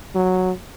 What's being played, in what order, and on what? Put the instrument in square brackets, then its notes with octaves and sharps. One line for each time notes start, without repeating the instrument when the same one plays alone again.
[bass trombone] F#3